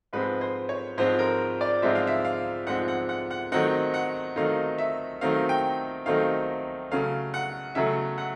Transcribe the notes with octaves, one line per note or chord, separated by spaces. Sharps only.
G#2 F3 G#3 C4 B4
C5
C#5
G#2 F3 G#3 C4 C5
A#4
D5
G#2 F3 G#3 C4 E5
F5
E5
F5
G#2 F3 G#3 C4 F#5
F#5
F#5
F#5
D#3 F#3 A3 C4 D#4 F#5
F#5
D#3 F#3 A3 C4 D#4 F5
E5
D#3 F#3 A3 C4 D#4 F5
G5
D#3 F#3 A3 C4 D#4 F5
C#3 F#3 A3 F5
F#5
C#3 F#3 A3 E5
F#5